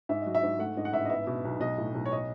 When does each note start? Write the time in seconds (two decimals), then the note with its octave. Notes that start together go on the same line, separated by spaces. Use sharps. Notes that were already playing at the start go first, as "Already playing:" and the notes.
0.09 G#2 E5
0.22 F#3 D#5
0.35 E5
0.43 G#2
0.59 A3 F#5
0.77 G#2 D#5
0.85 F#5
0.93 A1 E5
1.05 D#5
1.10 B3 E5
1.27 B2
1.45 B1
1.60 B1 D#5
1.78 A2
1.94 B1
2.05 C#5
2.12 D#5